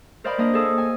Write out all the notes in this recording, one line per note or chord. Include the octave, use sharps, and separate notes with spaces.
A#4 C5 D5 D#5 F5 B5
A#3 D4 D#5
G#4 A4 D#6
G#5